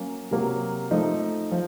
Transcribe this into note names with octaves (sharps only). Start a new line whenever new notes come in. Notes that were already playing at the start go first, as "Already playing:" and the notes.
Already playing: F#3 A#3 C#4
C3 F#3 A#3
F3 A3 D#4
F3